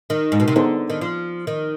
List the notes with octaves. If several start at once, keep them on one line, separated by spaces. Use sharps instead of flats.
D#3
G#2
B2
C3
D3 B3 D#4 G#4 C5
D#3
F3
D#3